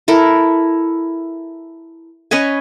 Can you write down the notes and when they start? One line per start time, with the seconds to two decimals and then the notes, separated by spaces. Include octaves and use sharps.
0.08 E4 A4 A#4
2.31 C#4 B4 D#5 G#5